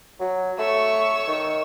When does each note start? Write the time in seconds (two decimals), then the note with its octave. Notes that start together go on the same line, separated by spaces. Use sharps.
0.20 F#3
0.59 A3 C#5 C#6 E6
1.27 D#3